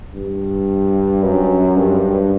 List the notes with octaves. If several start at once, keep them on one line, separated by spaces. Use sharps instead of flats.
G2
F#2
G2